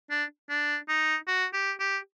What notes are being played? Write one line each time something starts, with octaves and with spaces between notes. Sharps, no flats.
D4
D4
D#4
F#4
G4
G4